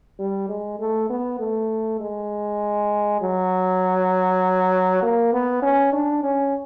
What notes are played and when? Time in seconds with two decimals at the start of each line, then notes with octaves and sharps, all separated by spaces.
0.19 G3
0.49 G#3
0.79 A3
1.09 B3
1.39 A3
2.00 G#3
3.21 F#3
5.02 A#3
5.33 B3
5.62 C#4
5.93 D4
6.23 C#4